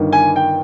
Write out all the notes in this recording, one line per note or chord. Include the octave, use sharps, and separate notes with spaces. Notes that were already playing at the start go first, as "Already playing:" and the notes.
Already playing: G1 G2 D#3
G#5
G5